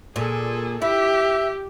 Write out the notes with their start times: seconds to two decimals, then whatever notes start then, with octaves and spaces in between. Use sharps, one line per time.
0.16 A#2 G#4 A4
0.82 E4 G4 E5